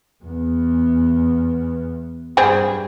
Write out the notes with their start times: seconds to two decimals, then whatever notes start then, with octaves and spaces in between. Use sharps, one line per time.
0.25 E2 B3
2.37 G2 G3 C4 G#4